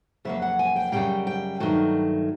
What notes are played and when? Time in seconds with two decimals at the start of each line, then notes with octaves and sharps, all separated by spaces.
0.25 F2 C#3 F#3 A#3 E5
0.42 F#5
0.59 G#5
0.76 G5
0.92 F#2 C#3 E3 G3 A#3 G5
1.27 G5
1.60 G2 D#3 F#3 A3